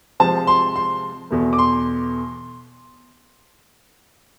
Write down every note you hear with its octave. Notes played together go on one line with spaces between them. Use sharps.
C3 F3 G#3 C4 A5
C6
C6
E2 B2 A3
D6
C6